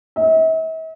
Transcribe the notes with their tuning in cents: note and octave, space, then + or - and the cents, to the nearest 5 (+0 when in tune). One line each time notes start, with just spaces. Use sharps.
E5 -45